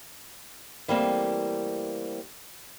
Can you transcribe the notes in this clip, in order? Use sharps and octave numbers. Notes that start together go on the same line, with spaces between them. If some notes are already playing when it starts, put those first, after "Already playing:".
E3 G3 A3 A#3 C4